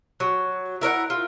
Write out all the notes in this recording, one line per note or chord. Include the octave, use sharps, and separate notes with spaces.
F#3
E4 A#4 C#5 F#5
F4